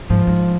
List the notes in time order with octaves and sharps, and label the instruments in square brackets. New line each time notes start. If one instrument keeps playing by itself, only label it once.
[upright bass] G#2 [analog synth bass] F3
[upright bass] G#2